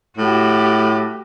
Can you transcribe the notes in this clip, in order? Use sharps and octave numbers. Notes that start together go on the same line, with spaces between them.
A2 F#4 G4